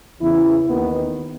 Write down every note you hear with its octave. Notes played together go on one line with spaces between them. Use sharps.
E2 C#3 E3 E4
D#2 D#3 B3